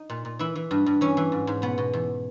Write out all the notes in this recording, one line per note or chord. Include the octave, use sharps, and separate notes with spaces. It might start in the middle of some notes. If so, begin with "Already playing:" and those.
Already playing: D#4
A#2
A#2
E3 E4
E3
G2
G2
E3 C#4
E3
G#2
G#2
B2 B3
B2
E2